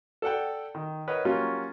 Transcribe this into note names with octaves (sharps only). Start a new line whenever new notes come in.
A4 D5 F#5 G5
D#3
A#4 B4 C#5 D#5 F#5
F#3 G3 A#3 C#4 F4 F#4